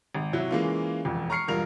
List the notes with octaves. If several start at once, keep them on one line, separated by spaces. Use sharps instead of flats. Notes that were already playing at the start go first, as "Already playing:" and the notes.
G#1
C3 F#3 E4 F#4
E3 G#3 A#3 C#4 F4
E1 F2
A#5 C#6 F6 C7 C#7
E1 G2 F4 A#4 F7